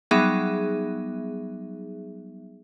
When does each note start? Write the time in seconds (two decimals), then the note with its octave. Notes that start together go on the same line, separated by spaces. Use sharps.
0.11 F#3 G3 B3 D#4 G#4 E5